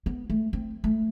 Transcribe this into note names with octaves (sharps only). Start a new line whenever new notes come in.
B3
A3
C4
A3